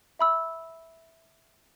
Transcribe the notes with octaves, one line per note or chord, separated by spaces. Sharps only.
E5 B5 E6